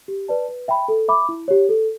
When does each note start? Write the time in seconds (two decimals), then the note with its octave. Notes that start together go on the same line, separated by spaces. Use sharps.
0.08 G4
0.28 B4 D5 A5
0.49 B4
0.68 E5 G5 B5
0.88 A4
1.08 E5 B5 D6
1.29 E4
1.48 G4 C#5
1.69 A4